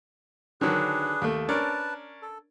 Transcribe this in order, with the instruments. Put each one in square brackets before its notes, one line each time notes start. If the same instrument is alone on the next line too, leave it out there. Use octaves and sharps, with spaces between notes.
[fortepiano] D3 D#3 F#3 [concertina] D4 G#4 B4
[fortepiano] D#2 A3
[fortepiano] C#4 D4 A#4 [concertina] B4 A5
[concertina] A4